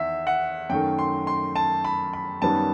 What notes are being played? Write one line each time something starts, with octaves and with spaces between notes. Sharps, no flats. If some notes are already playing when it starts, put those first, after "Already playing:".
Already playing: E2 D#3 E5
F#5
F#2 D#3 A3 G5
C6
C6
A5
B5
B5
F#2 D#3 G3 B3 A5